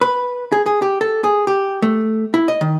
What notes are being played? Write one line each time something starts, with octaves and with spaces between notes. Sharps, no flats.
B4
G#4
G#4
G4
A4
G#4
G4
A3
E4
D#5
D#3